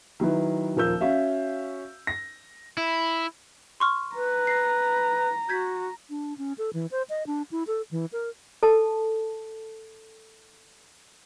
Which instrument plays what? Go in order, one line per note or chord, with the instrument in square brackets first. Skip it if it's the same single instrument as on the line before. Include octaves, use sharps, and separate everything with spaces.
[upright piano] D#3 F#3 E4 B4
D#1 F3 A#4 E6 G6
C#4 F#4 E5 F5
A#6
[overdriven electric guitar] E4
[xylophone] C6 C#6 F6
[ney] B4 [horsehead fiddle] A#5
[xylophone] A#6 C7
[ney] F#4 [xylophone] G6 G#6 B6
[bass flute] D4
C#4
A4
E3
C5
D#5
D4
E4
A4
E3
A#4
[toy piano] A4 A5